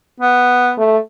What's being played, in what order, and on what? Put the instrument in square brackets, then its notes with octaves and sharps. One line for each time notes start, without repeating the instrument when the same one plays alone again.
[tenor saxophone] B3
[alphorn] A3